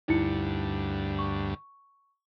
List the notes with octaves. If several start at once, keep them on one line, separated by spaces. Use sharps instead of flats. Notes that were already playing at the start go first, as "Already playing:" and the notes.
D2 G2 D#4 E4 C#7
C#6